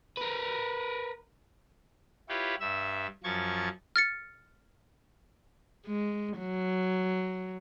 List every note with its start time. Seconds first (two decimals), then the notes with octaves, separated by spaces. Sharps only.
0.17 A#4 B4
2.29 E4 F4 G4 B4 C#5
2.60 G2 E5 E6
3.24 F#2 F3 C#6 G#6 A6
3.96 F6 A6 C#7
5.86 G#3
6.38 F#3